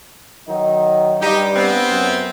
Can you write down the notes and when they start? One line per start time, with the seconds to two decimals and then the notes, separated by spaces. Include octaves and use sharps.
0.47 D#3 F#3 D#4
1.20 G2 G3 D#4 G4
1.55 B3 C4
1.90 F#2